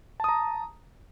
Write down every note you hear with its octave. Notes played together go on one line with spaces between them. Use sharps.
A5 A#5 D#6